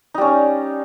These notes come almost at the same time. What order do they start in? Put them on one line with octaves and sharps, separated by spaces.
D#4 G3 C#4